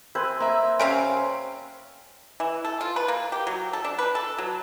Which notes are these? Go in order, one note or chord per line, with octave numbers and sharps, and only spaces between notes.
C4 B4 G#5
A#3 E5
C3 C#4 F5
E3
A4
F4
B4
A#3
G4
F#3
A4
D4
B4
A4
F#3